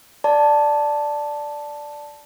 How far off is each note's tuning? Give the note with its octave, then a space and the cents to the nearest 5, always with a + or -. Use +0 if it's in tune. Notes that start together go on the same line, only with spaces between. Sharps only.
D5 +0 A5 +0